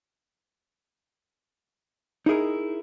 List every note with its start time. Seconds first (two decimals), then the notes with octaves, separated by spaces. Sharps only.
2.26 D#4 E4 G#4 A#4